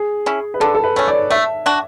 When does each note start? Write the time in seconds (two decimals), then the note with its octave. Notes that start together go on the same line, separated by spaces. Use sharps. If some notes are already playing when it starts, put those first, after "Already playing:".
Already playing: G#4
0.26 C#4 E4
0.54 B4
0.60 D3 A4
0.75 A4
0.84 B4
0.96 A3 C#4 C#5
1.08 D5
1.30 A3 E5
1.66 D4 F#4